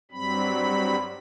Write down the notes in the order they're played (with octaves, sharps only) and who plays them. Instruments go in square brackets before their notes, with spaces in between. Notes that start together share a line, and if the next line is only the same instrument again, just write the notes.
[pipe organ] G2 F#3 G3 C4 B5